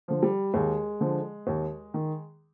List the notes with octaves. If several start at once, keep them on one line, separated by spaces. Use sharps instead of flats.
D3 F3
G3
D#2 G#3
D3 F3
D#2
D#3